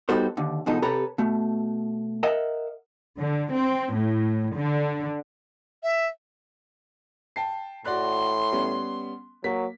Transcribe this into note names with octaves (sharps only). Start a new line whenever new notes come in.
G3 B3 D#4 F#4 A4 C5
D#2 D3
E2 G#2 B2 F3 D#4 A4
C3 G4 A4 B4 C#5 A#5
B2 A3
A#4 D#5 E5 F#5
D3
C4
A2
D3
E5
G5 A5 C7
A2 F#4 D5 C6 F#6
G3 B3 C#4
F#3 A#3 B6